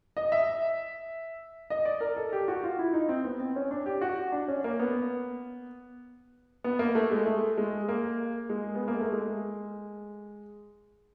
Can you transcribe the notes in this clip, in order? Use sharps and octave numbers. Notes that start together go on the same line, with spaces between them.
D#5
E5
D#5
D5
A#4
A4
G4
F#4
F4
E4
D#4
C4
B3
C4
C#4
D4
G4
F#4
D4
C#4
A#3
B3
B3
A#3
A3
G#3
A3
G#3
A#3
G#3
B3
A#3
A3
G#3